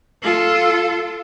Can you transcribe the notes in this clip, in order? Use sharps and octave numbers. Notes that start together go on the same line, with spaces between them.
F4 A4